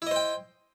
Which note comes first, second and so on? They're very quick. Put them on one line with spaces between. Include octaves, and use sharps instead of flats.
E4 D#5 C5 G5